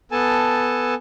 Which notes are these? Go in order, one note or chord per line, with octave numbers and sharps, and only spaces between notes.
B3 A4 G#5 A5